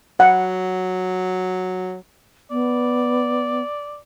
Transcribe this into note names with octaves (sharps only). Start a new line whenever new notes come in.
F#3 F#5
B3 D5